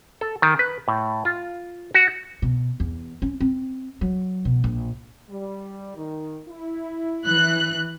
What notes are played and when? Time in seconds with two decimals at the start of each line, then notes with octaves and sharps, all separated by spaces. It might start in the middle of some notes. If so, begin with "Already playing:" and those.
0.21 A4
0.42 D#3
0.59 B4
0.88 A2
1.25 F4
1.94 F#4
2.42 B2
2.80 E2
3.22 C#4
3.40 C4
4.01 F#3
4.45 B2
4.64 A#1
5.29 G3
5.96 D#3
6.48 E4
7.25 E3 F#6